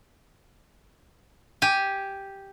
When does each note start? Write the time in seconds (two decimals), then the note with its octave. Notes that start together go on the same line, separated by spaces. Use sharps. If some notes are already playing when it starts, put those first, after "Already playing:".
1.62 G4 G#5